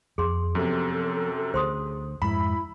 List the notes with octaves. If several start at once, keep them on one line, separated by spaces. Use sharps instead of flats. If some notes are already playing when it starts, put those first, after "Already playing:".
F2 G#4 C6
F#2 C3 F3 B3 A4
D2 G#4 C5 C6 D#6
F2 G#2 G#3 E4 A#5 B5